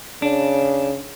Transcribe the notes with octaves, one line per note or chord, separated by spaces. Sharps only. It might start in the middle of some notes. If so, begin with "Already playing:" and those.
C#3 D4